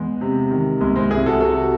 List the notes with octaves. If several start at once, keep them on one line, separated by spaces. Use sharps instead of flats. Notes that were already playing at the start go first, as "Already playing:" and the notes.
Already playing: E2 G#3
C3
D#3
C2 G#3
G#3 C4
C2 E4 G#4
F#4 A4
C3 F#4 A4